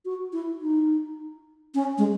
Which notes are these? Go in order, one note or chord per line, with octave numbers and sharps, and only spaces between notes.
F#4
E4
D#4
C#4
G#3